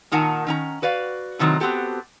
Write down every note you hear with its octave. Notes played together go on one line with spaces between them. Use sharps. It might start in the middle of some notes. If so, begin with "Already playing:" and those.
A#2 D#3 A#4 F#5 G#5 A5
D#3 C#4 A#5
F#4 B4 D5 F5
A2 C3 D#3 F#3 C4
B3 C4 F#4 G4 A4